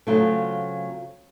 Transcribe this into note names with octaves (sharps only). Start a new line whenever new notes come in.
C#3 F#3 A3 C4 F4